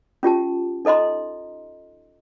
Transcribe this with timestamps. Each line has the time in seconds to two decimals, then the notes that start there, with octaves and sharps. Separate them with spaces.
0.23 C#4 F4 G4 A5
0.85 D#4 A4 D#5 A#5 C6